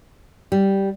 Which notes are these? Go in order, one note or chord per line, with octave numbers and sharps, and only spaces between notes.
G3